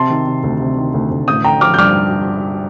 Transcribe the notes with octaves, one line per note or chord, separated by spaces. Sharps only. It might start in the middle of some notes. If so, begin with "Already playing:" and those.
Already playing: C3 A5 C6
D#3
C3
D2
C3
D#3
D2
D2
A1 D#6 G6
D3 G5 A#5
F3 D6 F6
G6
G2 D6 F6